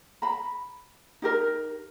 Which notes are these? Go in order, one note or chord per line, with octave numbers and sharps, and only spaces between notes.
A#5 B5
D#4 G4 A#4